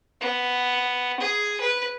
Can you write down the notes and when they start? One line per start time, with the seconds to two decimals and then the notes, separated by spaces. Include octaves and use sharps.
0.21 B3
1.20 G#4
1.61 B4